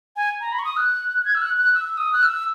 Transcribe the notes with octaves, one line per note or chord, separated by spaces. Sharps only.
G#5
A#5
B5
C#6
D#6
F#6
F#6
G#6
E6
F#6
F#6
E6
D#6
F#6
E6